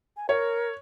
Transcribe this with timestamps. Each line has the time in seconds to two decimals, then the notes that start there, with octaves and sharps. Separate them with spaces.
0.17 G#5
0.29 A#4 C#5